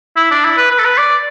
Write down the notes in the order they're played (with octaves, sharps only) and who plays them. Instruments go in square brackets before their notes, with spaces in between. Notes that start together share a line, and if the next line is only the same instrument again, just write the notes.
[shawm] E4
D4
E4
B4
B4
A4
B4
D5